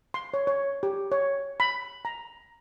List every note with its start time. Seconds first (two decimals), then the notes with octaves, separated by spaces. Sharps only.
0.14 C6
0.34 C#5
0.47 C#5
0.83 G4
1.12 C#5
1.60 B5
2.05 A#5